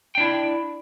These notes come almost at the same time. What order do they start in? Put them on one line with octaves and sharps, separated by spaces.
G5 D4 E4